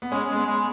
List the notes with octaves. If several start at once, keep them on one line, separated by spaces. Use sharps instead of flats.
B3
G#3 C#4
G#3
B3
G#3